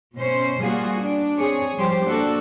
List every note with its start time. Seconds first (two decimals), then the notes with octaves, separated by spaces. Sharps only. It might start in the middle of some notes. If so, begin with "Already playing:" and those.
0.15 B2 C#4 C5
0.61 G3 A#3 F4 F#4 G#4
1.00 D4
1.38 C4 G#4 C#5
1.76 F3 G3 G4 C5
2.06 A#3 D4 F#4 A4